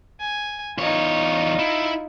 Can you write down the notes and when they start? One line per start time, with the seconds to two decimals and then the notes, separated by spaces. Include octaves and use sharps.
0.21 G#5
0.78 E2 D#4 F4 C#5
1.59 E4